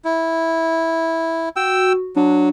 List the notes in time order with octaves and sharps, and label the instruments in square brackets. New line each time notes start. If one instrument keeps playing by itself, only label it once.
[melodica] E4
[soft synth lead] F#4 [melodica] G5 E6
[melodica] F#3 [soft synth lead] D4